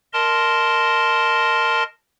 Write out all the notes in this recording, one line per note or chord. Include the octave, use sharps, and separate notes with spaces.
A#4 D#5 A5 C6